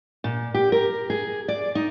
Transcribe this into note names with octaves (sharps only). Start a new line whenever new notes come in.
A#2
G4
A#4
G#4
D5
D#4